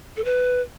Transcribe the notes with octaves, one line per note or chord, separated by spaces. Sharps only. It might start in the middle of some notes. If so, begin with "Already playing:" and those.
A4
B4